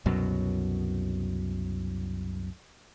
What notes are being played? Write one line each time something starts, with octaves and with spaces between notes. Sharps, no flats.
C2 F#2 B2 F#3